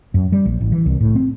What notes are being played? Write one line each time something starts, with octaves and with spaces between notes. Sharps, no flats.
F#2
G3
A#1
A1
E3
C2
A2
C4